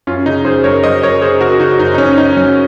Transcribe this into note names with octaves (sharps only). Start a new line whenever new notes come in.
F#2 C#4 F4
C#3 D#4
F#2 G#4 C5
F#2 A#4 C#5
F#3 C5 D#5
F#2 A#4 C#5
C#3 G#4 C5
C#3 F#4 A#4
C#3 D#4 F#4
F#2 D#4
D#4
F#2 C#4
F#3 D#4
F#3 C#4